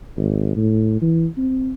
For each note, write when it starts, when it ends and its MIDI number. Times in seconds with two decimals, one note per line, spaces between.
0.17 0.54 32
0.56 0.99 45
1.01 1.26 52
1.38 1.74 60